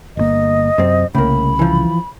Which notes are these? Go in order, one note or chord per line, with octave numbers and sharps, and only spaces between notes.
G1 D3 A#3 D#5
F#2 C3 C4
C2 A2 C#3 A#3 B5
E3 F3